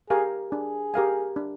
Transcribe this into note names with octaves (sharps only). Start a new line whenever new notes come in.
G4 G#4 A#4 F5 G#5
D4 G#4
G4 A#4 F5 G#5
D4